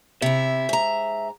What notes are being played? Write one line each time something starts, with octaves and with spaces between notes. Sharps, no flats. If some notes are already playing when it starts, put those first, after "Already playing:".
C3 E4 E5
G#2 A#5